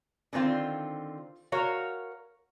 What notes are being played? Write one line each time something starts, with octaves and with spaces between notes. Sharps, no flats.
D3 D#3 C4 F4
F#4 A#4 C#5 F5